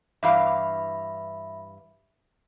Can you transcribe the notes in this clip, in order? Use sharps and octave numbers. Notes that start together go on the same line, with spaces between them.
G2 E3 E5 F5 B5